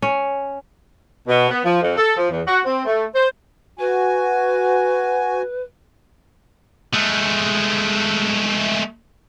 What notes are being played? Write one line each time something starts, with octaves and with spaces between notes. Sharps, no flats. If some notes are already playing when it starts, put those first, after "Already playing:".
C#4
B2
B3
F3
F2
A4
F3
E2
F#4
C4
A3
C5
F#4 B4 G#5
G#3 A3